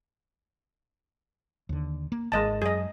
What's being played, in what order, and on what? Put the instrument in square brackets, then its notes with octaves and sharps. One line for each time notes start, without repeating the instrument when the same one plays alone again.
[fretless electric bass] D#2 D3
A#3
[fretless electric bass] G#1 [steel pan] G#3 D#5 A5
[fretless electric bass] F#2 [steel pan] G#4 D#5